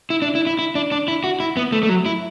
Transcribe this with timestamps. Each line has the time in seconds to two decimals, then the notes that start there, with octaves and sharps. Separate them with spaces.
0.10 E4
0.22 D4
0.35 E4
0.47 E4
0.59 E4
0.75 D4
0.92 D4
1.08 E4
1.24 F#4
1.40 E4
1.57 B3
1.72 A3
1.83 A3
1.89 F#3
2.06 E4